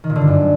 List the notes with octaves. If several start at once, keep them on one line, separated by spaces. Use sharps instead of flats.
D#3
A#2
D3
G2
F#2